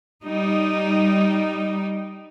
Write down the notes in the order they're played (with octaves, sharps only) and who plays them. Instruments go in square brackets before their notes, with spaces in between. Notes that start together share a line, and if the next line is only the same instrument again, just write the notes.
[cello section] G3 D#4